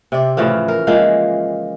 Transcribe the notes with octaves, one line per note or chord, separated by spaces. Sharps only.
C3 D5
A2 C#3 E3 F3
A#4
E3 F3 G#3 A#3